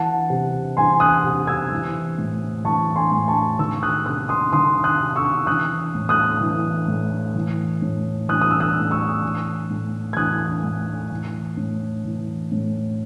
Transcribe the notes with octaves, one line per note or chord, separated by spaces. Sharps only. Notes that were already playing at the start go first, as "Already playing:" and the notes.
Already playing: E3 F#5 A5
C3
E3 G#5 C6
D#6 F#6
C3
E6 G#6
E3
A2
E3 A5 C#6
G#5 C6
A2
A5 C#6
D#3 C#6 E6
D#6 F#6
C3 D#6 F#6
C6 D#6
D#3 C6 D#6
D#6 F#6
C3
C#6 E6
E3 D#6 F#6
A2
D#6 F#6
E3
A2
E3
A2
E3 D#6 F#6
D#6
E6
D#6 F#6
A2
C#6 E6
E3
A2
G#6
E3 D#6 F#6
A2
E3
A2
E3
A2